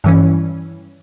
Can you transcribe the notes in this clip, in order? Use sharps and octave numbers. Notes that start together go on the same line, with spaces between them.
G2 E3 C#4